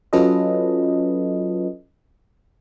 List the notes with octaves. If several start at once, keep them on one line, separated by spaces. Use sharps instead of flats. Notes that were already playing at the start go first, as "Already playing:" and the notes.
F#3 C#4 F4 A4 B4 D#5